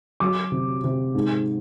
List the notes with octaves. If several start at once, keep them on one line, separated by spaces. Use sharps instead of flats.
F#3 D6
C3
C3
G#2